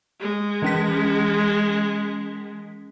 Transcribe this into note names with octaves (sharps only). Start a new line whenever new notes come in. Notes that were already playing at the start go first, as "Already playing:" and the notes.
G#3
E3 C#4 B6